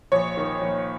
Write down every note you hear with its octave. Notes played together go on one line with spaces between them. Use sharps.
A#1 C#5
D#3
A#1